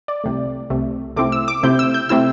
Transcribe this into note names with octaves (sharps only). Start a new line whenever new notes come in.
D5
C2 C3 A3
C2 C3 A3
C3 A3 C4 E4 D6
E6
D6
C3 A3 C4 E4 G6
E6
G6
C3 A3 C4 E4 E6